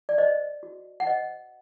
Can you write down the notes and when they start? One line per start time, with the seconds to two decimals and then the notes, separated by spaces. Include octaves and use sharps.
0.09 D5
0.18 C5 D#5
0.63 F#4
1.00 F#5
1.06 C5 D#5